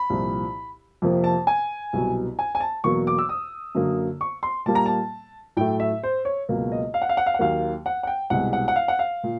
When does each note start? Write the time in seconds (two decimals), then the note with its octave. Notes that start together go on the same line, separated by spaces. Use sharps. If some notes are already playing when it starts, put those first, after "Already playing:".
Already playing: B5
0.10 C2 A#2 F3
1.02 F2 C3 F3 A#3
1.24 A5
1.47 G#5
1.93 C2 B2 F#3
2.39 G#5
2.55 G#5
2.60 A5
2.84 E2 B2 F#3 A#3 C#6
3.07 D6
3.19 E6
3.29 D#6
3.75 F#2 D3 F#3 A#3
4.21 C#6
4.43 C6
4.66 A#2 G3 A#3 A5
4.75 A#5
4.86 A5
5.57 A2 F#3 A3 G5
5.80 E5
6.03 C5
6.25 C#5
6.49 C#2 B2 F#3 A#3
6.72 D#5
6.94 F5
7.02 F#5
7.09 F5
7.17 F#5
7.26 F5
7.34 F#5
7.39 D#2 D#3 F#3 A#3 F5
7.86 F#5
8.03 F#5
8.07 G5
8.30 C2 B2 G#3 F#5
8.53 F#5
8.68 F#5
8.76 F5
8.88 F#5
8.99 F5
9.24 A#2